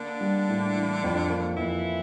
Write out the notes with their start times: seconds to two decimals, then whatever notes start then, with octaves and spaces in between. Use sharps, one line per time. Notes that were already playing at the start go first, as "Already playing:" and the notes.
Already playing: D3 A#3 D4
0.21 G3
0.49 A2
0.75 E3
1.04 F2
1.30 A#3
1.57 F2 E3 E4